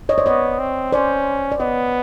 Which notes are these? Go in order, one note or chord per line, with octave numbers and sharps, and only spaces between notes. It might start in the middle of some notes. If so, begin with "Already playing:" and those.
C#5 D#5
C5 D5
B3 C#5 D#5
C4
C#4 C5 D5
D5
B3 C#5 D#5